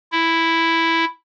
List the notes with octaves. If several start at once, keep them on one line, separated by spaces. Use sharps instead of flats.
E4